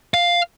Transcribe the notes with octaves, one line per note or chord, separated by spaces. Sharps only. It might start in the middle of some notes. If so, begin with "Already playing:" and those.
F5